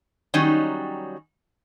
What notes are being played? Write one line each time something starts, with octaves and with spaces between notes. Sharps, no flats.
D#3 F#3 G3 C#4 D#4